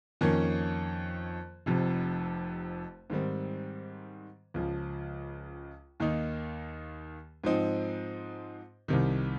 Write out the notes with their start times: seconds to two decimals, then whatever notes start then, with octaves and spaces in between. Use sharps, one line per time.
0.21 F2 D#3 A#3 C#4
1.66 F1 F2 C3
3.10 G#2 D#3 G3 C4
4.54 C#2 C#3 F3
6.00 D#2 D#3 A#3 D#4
7.44 G#2 F3 C4 D#4
8.88 C2 C3 D#3